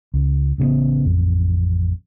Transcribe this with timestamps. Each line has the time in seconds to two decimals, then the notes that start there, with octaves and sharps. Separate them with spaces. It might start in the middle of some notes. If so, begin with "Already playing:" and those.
0.14 C#2
0.58 A1 C#3 F#3 B3
1.05 A1 F2